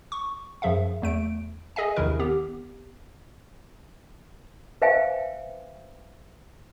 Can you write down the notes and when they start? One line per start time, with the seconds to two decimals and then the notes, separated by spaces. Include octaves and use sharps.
0.12 C#6
0.62 F#2 F3 G#4 E5 F5
1.02 E2 A3 D7
1.76 G#4 D#5 E5 G#5
1.96 A#1 D#2 C3 D#3 E4 A#4
2.19 B3 G4
4.82 B4 C5 E5 F5 G5 G#5